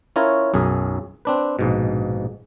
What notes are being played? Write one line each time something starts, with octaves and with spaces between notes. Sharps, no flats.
C#4 E4 F4 A#4 C#5
B1 F#2 G#4
C4 D4 B4
A#1 G#2 B2